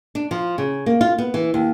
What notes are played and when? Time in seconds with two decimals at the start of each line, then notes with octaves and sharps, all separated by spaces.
0.15 D4
0.31 F3
0.58 C#3
0.86 A#3
1.01 F4
1.18 B3
1.34 E3
1.54 D#2